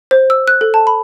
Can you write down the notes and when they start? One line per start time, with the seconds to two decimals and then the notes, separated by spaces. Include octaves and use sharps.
0.11 C5
0.30 E6
0.48 F#6
0.61 A4
0.74 A5
0.87 B5